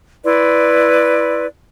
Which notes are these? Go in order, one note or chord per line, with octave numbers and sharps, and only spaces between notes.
E4 B4 D5 C6